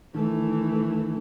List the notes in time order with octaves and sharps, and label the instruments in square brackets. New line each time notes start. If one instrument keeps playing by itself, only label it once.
[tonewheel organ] D#3 [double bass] E3 A3